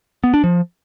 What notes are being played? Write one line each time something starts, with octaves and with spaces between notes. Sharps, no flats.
B3
D4
F3